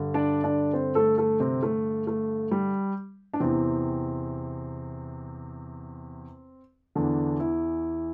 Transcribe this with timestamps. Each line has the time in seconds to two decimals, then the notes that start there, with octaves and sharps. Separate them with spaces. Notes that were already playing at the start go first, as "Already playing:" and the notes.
Already playing: G2 D3
0.14 D4 D5
0.44 D4 D5
0.73 C4 C5
0.95 A3 A4
1.18 A3 A4
1.40 C3 C4
1.63 A3
2.07 A3
2.51 G3
3.34 D4
3.40 E2 C3 E3 C4
6.95 E2 D3 E3 D4
7.40 E3 E4